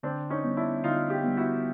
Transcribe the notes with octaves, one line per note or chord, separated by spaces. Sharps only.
D3 C4 D4
C#4 D#4
G3 B3
D4 E4
D3 D#4 F4
F4 G4
G3 B3
E4 F#4